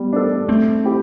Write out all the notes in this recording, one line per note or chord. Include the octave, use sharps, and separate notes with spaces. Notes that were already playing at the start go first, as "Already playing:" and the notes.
Already playing: G3 B3
D4 A4
A3 C4
E4 G4